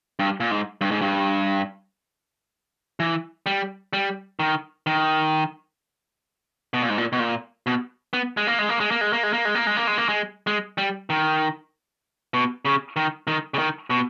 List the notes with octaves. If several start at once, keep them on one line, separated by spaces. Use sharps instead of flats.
G2
A#2
G#2
G2
G#2
G2
E3
G3
G3
D#3
D#3
B2
A#2
G#2
A#2
B2
A#2
B2
B3
G#3
A#3
G#3
A#3
G#3
A#3
G#3
A#3
G#3
A#3
G#3
A#3
G#3
A#3
G#3
A#3
G#3
G#3
G3
D#3
B2
C#3
D#3
D#3
C#3
D#3
B2